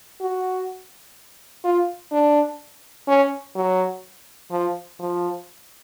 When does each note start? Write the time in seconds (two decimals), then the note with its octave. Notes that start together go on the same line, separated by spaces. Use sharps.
0.21 F#4
1.64 F4
2.12 D4
3.08 C#4
3.55 F#3
4.51 F3
4.99 F3